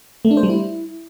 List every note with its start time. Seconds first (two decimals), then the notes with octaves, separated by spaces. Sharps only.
0.25 A3
0.31 D4
0.37 C5
0.43 G3
0.49 E4